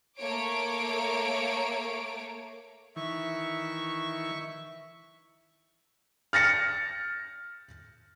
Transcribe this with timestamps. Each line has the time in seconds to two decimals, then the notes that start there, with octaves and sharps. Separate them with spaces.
0.18 A3 A#3 C#5 D6 D7
2.96 D#3 E3 E5 C#6
6.33 F6 A6 A#6 C#7